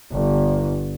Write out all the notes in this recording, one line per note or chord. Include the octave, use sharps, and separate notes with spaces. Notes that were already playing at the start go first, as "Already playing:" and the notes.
G1